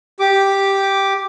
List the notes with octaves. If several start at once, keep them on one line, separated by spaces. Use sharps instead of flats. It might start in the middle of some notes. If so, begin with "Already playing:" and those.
G4 D6